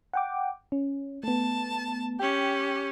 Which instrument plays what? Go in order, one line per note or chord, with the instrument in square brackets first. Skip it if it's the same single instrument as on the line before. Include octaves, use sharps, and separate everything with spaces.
[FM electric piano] F#5 G5 D6
C#4
[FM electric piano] A3 B3 [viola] A5
[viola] C#4 G4 [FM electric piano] G5